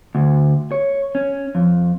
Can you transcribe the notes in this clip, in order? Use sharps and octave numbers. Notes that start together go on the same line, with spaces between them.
D2
C#5
C#4
F2